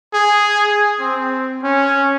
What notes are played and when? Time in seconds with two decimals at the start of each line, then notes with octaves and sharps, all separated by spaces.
0.14 G#4
0.99 C4
1.64 C#4